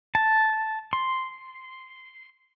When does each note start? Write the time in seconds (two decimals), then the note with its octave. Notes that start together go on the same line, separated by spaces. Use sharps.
0.15 A5
0.93 C6